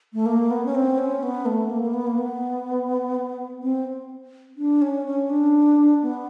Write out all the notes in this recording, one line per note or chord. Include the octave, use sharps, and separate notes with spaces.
A3
A#3
B3
C#4
C4
C#4
B3
A3
A#3
A#3
B3
A#3
B3
C4
D4
C#4
C#4
D4
B3